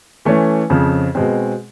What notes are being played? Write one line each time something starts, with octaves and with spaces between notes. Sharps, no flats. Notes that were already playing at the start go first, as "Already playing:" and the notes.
E3 A3 C#4
F2 C#3 F3
B2 G#3 C4